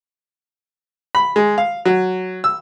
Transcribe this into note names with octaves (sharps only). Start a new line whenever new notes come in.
B5
G#3
F5
F#3
E6